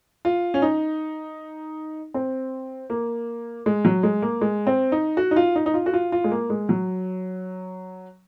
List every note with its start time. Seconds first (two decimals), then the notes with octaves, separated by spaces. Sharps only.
0.25 F4
0.54 C#4
0.62 D#4
2.14 C4
2.90 A#3
3.66 G#3
3.85 F#3
4.03 G#3
4.22 A#3
4.41 G#3
4.67 C4
4.92 D#4
5.17 F#4
5.31 D#4
5.36 F4
5.56 D#4
5.66 D#4
5.74 F4
5.86 F#4
5.94 F4
6.12 F4
6.24 G#3
6.31 A#3
6.50 G#3
6.69 F#3